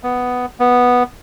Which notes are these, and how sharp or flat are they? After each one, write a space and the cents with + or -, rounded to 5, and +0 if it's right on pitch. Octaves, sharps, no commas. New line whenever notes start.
B3 +5
B3 -5